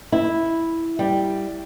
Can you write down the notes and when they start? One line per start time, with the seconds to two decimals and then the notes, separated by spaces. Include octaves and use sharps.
0.12 E4
0.99 G3